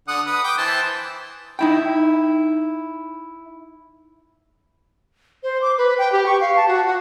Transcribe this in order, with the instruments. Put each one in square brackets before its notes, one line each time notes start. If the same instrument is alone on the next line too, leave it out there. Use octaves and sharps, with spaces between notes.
[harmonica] D3 F#5 D#6
B4 D#6
G5 D6
E3 C5 A5
[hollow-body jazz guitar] D#4 E4 G5
[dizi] C5
D6
B4
G5
G4
C#6
F5
A5
F#4
F#4